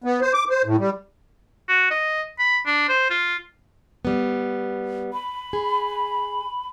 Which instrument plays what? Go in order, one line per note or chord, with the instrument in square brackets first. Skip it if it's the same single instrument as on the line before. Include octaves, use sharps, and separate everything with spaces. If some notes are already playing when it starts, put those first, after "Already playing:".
[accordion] B3
C5
D6
C5
A2
G3
[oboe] F#4
D#5
B5
D4
C5
F4
[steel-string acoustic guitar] G3 B3
[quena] B5
[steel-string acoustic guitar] G#4